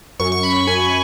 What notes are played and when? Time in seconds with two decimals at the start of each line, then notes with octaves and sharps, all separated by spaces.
0.20 F#2 C#6
0.32 C#6
0.43 B5
0.67 F#2 G#5